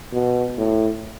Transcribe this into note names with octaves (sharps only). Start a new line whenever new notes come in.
B2
A2